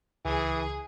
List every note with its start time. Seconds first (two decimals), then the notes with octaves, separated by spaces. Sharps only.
0.25 C#2 E3 G#4